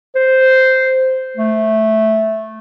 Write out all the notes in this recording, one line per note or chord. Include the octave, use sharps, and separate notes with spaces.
C5
A3